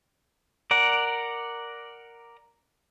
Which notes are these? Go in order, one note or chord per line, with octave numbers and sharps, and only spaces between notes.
A#4 D5 F#5